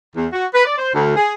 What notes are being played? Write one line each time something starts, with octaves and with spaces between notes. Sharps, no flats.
E2
F#4
B4
D5
C5
D2
G#4